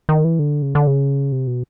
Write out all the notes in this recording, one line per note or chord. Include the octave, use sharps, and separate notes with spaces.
D#3
E3
D3
C#3
D3
C#3
C3
B2